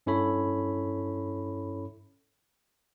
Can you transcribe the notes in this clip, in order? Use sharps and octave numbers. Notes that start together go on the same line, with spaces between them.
G2 C#4 E4 A4 C#5 B5